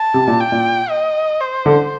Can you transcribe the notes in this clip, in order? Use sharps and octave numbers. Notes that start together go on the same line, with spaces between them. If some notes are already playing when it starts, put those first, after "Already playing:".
Already playing: A5
C3
A#2
G5
A#2
D#5
C5
D3